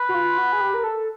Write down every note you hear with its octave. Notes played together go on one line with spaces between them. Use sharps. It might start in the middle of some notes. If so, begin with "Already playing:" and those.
Already playing: B4
F#4
F4
F#4
G#4
G4
A#4
A4